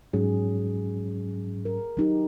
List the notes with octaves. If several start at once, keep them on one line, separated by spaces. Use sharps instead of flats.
G#2 F#3 C#4 G#4
A#4
F#3 D#4 G4